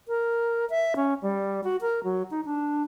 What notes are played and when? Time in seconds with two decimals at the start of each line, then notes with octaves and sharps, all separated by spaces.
0.08 A#4
0.70 E5
0.96 C#4
1.22 G3
1.64 F#4
1.81 A#4
2.04 F#3
2.31 D#4
2.45 D4